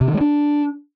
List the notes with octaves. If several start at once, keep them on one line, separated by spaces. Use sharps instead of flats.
C3
D#3
G#3
D4